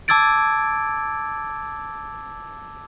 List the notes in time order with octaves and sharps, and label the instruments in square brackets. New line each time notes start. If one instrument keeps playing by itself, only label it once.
[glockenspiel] A5 D6 E6 G#6 A6 D7